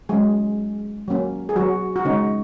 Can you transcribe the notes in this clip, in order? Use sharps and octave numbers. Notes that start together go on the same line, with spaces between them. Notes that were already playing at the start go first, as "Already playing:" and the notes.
F#3 G#3 C#4 G#4
F#3 A#3 C#4
G#4
F#3 F#4
F#4
C#3 G#3 C#4 D#4